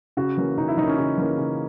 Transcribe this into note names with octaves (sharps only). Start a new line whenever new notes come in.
C#3 F#4
E3 A#3 C#4
C#3 D#4
E4
E3 A#3 C#4 D#4
C#4
C#3 D#4
E3 A#3 C#4
C#3